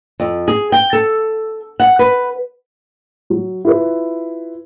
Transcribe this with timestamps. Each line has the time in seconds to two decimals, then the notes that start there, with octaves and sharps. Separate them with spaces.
0.20 F2
0.48 G#4
0.72 G5
0.93 A4
1.80 F#5
1.99 B4
3.30 F#3
3.65 E4 F4 B4